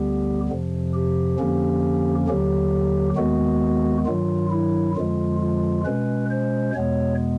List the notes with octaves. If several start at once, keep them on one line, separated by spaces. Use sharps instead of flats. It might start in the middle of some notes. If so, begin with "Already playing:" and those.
Already playing: D2 D3 G3 B3 G4
F2 C3 F3
G4
F2 D3 F3 A#3 C#4
D#2 D3 F#3 G4
D#2 D#3 G#3 B3 F#4
G2 D#3 F#3 F4
E4
F2 D3 F3 G#3 F4
F4
B2 G#3 C#4 B4
C5
E2 B2 G#3 B3 C#5